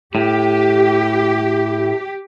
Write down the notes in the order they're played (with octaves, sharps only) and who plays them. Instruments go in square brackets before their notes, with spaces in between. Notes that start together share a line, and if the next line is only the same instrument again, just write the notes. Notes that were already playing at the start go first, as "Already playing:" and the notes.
[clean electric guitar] A2 [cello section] G4